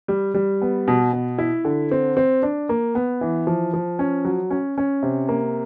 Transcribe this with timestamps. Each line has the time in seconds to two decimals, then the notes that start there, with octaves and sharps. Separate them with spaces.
0.08 G3
0.34 G3
0.62 B3
0.88 B2
1.13 B2
1.38 E4
1.65 D3
1.91 C4
2.17 C4
2.43 D4
2.69 A#3
2.95 B3
3.21 E3
3.47 F3
3.73 F3
3.99 C#4
4.25 F#3
4.51 C#4
4.78 C#4
5.03 C3
5.29 A#3